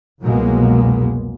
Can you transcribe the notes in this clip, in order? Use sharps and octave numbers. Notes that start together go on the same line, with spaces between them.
C2 F2 B2 F#3 G#3 A#3